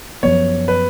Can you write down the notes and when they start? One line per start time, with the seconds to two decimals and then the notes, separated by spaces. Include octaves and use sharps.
0.23 F#2 F3 B3 C#5
0.68 B4